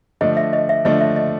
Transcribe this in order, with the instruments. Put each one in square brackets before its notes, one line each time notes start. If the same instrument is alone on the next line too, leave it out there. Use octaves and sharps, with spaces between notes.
[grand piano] D3 F3 A3 D4 [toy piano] D#5
[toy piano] E5
D#5
E5
[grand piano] D3 F3 A3 D4 [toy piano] D#5
[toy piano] E5
D#5